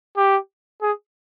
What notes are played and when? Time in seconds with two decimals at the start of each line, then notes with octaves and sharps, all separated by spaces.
0.17 G4
0.82 G#4